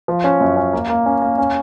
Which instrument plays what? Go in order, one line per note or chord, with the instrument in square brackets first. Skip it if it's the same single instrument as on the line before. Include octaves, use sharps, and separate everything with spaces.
[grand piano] F3
C#4
F#2
C#4
A#3
A#3
C#4
A#3
C#4